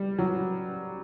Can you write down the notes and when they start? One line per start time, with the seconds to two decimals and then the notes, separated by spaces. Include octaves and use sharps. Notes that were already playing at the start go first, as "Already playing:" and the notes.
Already playing: G3
0.19 F#3